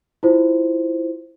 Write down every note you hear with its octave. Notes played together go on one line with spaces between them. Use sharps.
E4 F4 C5